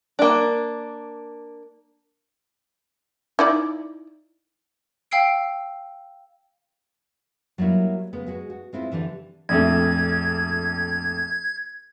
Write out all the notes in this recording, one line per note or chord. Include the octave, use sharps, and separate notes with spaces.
A#3 D4
D#4 E4 D5
F5 G5 E6 C7 D7
F#3 G3 A#3 E4 F#4
C#3 G#3 B3
G#3 F#4 G#4
F#4
G#3 C4 E4 F4
D3 E3 D4 G4
A#1 F2 A3 G#6